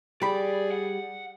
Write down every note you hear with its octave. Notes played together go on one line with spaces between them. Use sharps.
G3 G#4 D5 B5
F#5